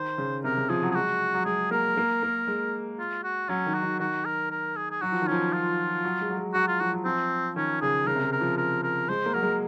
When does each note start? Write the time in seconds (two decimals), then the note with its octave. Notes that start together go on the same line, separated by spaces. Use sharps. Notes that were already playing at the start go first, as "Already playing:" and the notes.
Already playing: D#3 C5
0.18 C#3
0.44 C3 A#4
0.57 C#3
0.69 F3 G#4
0.83 F#3
0.91 G#4
0.95 G#3 F#4
1.34 F#3
1.45 G#3 G#4
1.71 A#3 A#4
1.97 A#3
2.23 A#3
2.47 G#3
2.99 F4
3.24 F#4
3.49 F#3 C#4
3.66 D#3
3.75 F#4
3.83 D#3
4.00 D#3 F#4
4.25 A#4
4.51 A#4
4.77 G#4
4.91 G#4
5.02 F#3 F#4
5.12 F3
5.22 D#3
5.27 F3 C#4
5.53 F4
6.04 F#3
6.21 G#3
6.30 F#3
6.37 G#3
6.54 F#3 F#4
6.68 F4
6.80 F3 F#4
6.93 F#3
7.05 F3 C4
7.56 D#3 C#4
7.82 C#3 G#4
8.07 C#3 A#4
8.15 C3
8.24 C#3
8.33 A#4
8.41 F3
8.57 A#4
8.83 A#4
9.09 G#3 C5
9.26 A#3
9.34 F#3 A#4
9.43 G#3